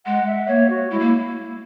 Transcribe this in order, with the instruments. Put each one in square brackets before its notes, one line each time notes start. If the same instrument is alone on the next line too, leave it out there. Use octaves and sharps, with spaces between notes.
[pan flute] G#3 [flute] F#5
[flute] E5
[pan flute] A#3 [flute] C#5
[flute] F#4
[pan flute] G#3 [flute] E4
[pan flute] A#3